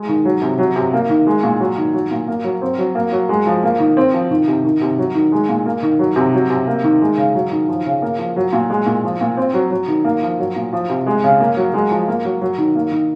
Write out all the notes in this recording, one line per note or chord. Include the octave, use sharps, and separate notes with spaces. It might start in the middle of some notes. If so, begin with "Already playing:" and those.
Already playing: G#3
D#3
F#3
C3
F#3
C3
A#3
D#3
G#3
A#2
F#3
D#3
F#3
A#2
A#3
F#3
C4
F#3
A#3
F#3
G#3
F3
A#3
D#3
C4
F3
D#3
C3
D#3
C3
F#3
D#3
G#3
A#2
A#3
D#3
F#3
C3
F#3
C3
A#3
D#3
G#3
C#3
F#3
D#3
F3
C#3
A#3
F3
F#3
A#2
G#3
A#2
F3
A#2
C4
F#3
F#3
D#3
A#3
F3
F#3
A#2
F3
C3
G#3
C#3
A#3
F#3
G#3
F3
A#3
F#3
F#3
D#3
A#3
D#3